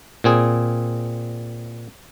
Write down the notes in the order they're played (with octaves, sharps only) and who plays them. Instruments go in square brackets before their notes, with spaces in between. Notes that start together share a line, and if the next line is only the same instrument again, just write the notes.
[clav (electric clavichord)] A#2 C4 G#4